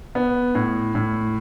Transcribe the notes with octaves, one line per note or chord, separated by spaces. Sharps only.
B3
A2
A2